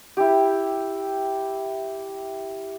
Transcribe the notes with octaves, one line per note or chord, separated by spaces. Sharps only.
E4 G4